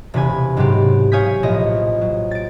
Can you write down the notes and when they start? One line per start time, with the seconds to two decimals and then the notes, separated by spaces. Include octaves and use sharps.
0.14 E1 C3 B4 G#5
0.57 G#2 C3 F#3 B3 C4 G4
1.12 C#5 F5 G#5 D#6 G6 B6
1.43 A#1 A2 D#5
2.01 F#3
2.31 A6 D7